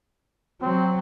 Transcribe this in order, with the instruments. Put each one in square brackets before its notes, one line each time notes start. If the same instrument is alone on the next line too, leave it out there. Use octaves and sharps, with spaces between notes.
[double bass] F#3 [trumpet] C4